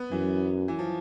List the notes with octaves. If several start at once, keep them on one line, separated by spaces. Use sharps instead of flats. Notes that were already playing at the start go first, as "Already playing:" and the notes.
Already playing: B3
F#2 E3
E3
F3